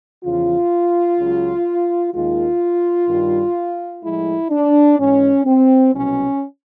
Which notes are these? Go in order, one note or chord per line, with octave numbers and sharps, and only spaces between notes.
E2 C#3 F3 F4
C#2 C#3 F#3
D#2 D#3 G#3 F4
G2 D#3 G3
A2 F3 G#3 E4
D4
G#2 E3 G#3 C#4
C4
C2 B2 F#3 C#4